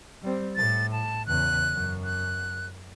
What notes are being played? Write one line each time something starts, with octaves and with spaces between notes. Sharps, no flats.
G3 C4
A2 A6
A5
E2 C#3 F#6
F#2
F#6